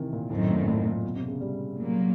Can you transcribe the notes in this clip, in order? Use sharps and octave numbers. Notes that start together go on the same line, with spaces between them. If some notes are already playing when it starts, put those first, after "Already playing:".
Already playing: C3 D#3 E3
A#2
F#2 A2 D#3 F#3 A3 C4
A#2
A#2
A2
A2
A#2
B2
C3
C#3
G3
A#2 F#3 A#3